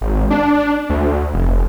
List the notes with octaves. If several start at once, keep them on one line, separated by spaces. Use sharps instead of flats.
G#1
D4
D2
F1